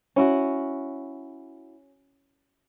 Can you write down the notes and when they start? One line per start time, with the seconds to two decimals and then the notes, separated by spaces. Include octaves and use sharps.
0.16 C#4 E4 F#4